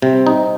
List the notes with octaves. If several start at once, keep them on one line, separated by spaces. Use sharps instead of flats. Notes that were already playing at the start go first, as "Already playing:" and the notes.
C3 G3 C4
D#4